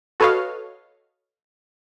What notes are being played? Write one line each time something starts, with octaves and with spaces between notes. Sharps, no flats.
F#4 A4 B4 C#5 D#5 F5